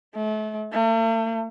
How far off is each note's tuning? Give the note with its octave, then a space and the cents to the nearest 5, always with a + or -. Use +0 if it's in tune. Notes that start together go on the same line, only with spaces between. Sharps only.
A3 -35
A3 +45